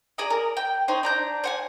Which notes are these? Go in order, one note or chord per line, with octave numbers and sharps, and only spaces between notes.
G#4 D5 A#5 D#6
A#4
G5
D#4 C5 C#5 D#5
D4 A#5 G6
C5 F#5 G#5